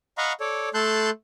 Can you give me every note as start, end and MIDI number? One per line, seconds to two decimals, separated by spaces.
0.18 0.33 75
0.18 0.33 77
0.18 0.33 78
0.18 0.33 82
0.18 0.33 83
0.18 0.33 85
0.40 0.69 69
0.40 0.69 73
0.40 0.69 74
0.74 1.10 57
0.74 1.10 69
0.74 1.10 81
0.74 1.10 84
0.74 1.10 90
0.74 1.10 91